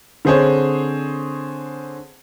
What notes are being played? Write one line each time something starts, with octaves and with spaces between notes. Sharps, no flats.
D3 C4 G#4 C5 C#5